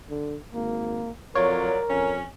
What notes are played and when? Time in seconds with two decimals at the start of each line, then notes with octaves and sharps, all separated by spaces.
0.10 D3
0.53 G#1 A#3
1.35 F2 F#3 F4 A#4 C#5 D5
1.90 F2 C#4